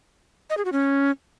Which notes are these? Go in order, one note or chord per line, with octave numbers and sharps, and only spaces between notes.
D#5
G#4
F#4
C#4